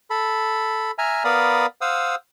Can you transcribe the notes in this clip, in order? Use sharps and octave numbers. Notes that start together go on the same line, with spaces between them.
A4 B5
E5 G#5 A#5 F6
B3 A#4 D5 F5 B5 D#6
C5 F5 F#5 D#6 E6